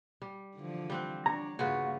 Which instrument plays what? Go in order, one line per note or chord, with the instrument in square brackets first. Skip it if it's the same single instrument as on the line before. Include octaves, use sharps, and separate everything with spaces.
[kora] G3
[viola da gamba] D3 E3 F3
[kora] G3 C4 F#5
[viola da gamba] D4 [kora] C#5 [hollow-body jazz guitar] A#5
[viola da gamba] G2 A#3 [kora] C#3 F4 B4 [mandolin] F#4